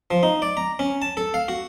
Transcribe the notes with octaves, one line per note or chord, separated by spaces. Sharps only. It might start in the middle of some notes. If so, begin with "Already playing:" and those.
F3
D#4
D5
A#5
C#4
A5
A4
F5
F#4